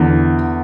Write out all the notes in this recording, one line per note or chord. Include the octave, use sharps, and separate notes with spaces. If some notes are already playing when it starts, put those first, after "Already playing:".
Already playing: E2 D3